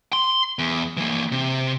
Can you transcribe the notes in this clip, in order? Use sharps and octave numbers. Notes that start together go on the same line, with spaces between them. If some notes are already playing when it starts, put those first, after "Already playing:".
C6
E2
E3 A#3
C3